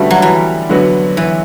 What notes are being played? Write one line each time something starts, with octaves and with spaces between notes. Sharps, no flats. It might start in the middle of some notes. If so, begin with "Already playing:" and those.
Already playing: D3 G3 A3 B3 C#4 F#4
F#3
E3
D3 F#3 B3 F#4
E3